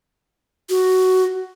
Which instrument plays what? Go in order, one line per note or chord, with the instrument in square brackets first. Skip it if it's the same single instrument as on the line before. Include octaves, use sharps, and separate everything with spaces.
[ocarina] F#4